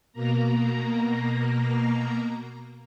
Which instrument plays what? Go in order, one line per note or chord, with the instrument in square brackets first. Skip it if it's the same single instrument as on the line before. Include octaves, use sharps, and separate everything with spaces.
[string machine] B2 A#3 A#5